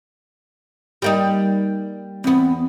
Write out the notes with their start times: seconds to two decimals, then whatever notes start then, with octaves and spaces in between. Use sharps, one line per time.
1.02 G3 A#3 D#4
2.24 E2 B3 C4